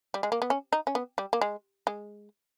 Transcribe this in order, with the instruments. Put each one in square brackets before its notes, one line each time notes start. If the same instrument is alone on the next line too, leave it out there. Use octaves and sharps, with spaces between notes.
[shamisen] G3
G#3
A#3
B3
C#4
D#4
C#4
B3
G3
A#3
G#3
G#3